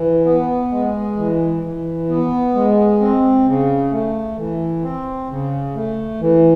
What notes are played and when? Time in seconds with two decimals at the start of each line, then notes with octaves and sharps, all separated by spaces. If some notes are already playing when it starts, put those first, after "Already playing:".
Already playing: E3
0.25 B3
0.71 G#3
1.17 E3
1.63 E3
2.09 B3
2.54 G#3
3.00 C4
3.46 C#3
3.91 A3
4.38 E3
4.83 C4
5.29 C#3
5.75 A3
6.21 E3